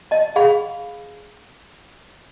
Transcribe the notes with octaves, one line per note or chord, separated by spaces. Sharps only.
D#5 A5
G#4 F5 B5